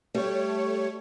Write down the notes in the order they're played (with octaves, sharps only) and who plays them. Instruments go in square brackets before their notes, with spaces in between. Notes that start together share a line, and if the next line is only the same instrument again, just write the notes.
[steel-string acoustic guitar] G3 [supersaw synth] A3 C#5